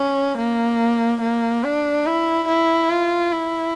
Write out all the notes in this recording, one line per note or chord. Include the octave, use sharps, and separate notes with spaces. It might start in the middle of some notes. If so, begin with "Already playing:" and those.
Already playing: C#4
A#3
A#3
D4
E4
E4
F4
E4